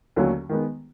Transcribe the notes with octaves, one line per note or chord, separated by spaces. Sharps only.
D#2 D3 F#3 A3 C#4
D#3 G#3 B3